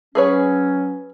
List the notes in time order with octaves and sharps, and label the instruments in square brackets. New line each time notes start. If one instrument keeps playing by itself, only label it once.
[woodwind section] F#3 C#4 [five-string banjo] G#4 B4 C#5